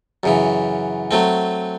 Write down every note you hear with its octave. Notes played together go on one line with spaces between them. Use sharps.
F#2 C#3 E3
F#3 A3 C4